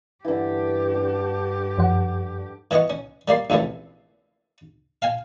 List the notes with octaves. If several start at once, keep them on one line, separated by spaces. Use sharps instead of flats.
G2 D3 E3 G4
D4
F#2 F3 F#5
E3 B3 D#5 F#5 C#6
C#4
G3 A#3 D5 C6
A#1 C3 E3 A3 C#4
F5 G5 G#5